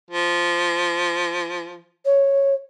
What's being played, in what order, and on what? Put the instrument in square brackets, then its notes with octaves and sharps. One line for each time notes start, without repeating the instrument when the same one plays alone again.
[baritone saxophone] F3
[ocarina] C#5